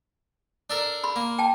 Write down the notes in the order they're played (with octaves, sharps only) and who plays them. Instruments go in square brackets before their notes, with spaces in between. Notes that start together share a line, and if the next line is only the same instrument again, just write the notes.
[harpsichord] D4 A4 A#4
[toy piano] B5 C6
[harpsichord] A#3
[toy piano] G5 A5